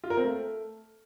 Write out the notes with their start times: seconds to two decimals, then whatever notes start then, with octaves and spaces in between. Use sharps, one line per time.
0.04 F4
0.10 A#4
0.17 C4
0.24 A3